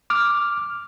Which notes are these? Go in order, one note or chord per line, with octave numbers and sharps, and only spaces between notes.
D6 F6